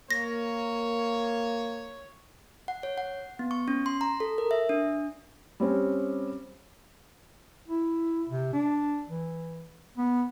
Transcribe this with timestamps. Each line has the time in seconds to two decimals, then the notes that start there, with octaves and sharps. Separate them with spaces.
0.11 A#3 C#5 A#6
2.68 F#5
2.83 C#5
2.98 F#5
3.39 B3
3.51 C#6
3.68 C#4
3.86 C6
4.01 A#5
4.20 A4
4.38 A#4
4.51 E5
4.69 D4
5.60 G3 C4 C#4
7.68 E4
8.29 C3
8.53 D4
9.09 E3
9.98 B3